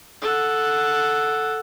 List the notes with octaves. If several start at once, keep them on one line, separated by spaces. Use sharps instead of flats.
A4 F#5